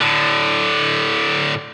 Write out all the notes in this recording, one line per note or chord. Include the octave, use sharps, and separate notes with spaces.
A2 D3